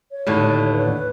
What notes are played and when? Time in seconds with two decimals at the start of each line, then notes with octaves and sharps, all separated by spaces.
0.11 C#5
0.27 D#2 A2 D3
0.73 B4